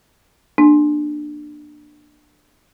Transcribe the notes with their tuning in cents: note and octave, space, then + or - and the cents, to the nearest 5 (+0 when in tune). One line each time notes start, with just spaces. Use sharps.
A#3 +20 D4 +20